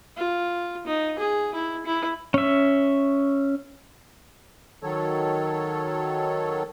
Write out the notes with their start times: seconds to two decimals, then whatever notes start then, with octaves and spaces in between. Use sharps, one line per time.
0.17 F4
0.87 D#4
1.19 G#4
1.55 E4
1.86 E4
2.34 C#4 E5
4.83 D#3 F#3 A4 C#5